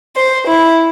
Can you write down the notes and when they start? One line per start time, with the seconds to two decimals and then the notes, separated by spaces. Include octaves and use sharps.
0.16 C5
0.48 E4